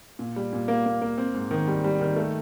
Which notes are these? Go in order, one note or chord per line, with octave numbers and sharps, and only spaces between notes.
A#2
G3
A#2
A#3
A#3
A#3
C4
G#2
D#3
G3
G3
D#3
A3